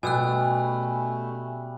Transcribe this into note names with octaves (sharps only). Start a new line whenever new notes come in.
B2 G3 A3 C#4 G#5 E6 F#6